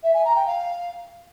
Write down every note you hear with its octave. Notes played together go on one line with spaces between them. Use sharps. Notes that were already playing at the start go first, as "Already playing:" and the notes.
E5
G#5
A#5
G5
F5